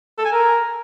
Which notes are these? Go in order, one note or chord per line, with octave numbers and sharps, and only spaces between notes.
A4
G#5
A#4